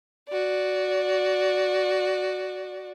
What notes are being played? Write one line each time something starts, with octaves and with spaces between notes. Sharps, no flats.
F#4 D5